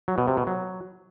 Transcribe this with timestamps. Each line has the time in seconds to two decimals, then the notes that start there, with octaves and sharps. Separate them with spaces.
0.08 F#3
0.18 B2
0.28 C3
0.37 B2
0.47 F#3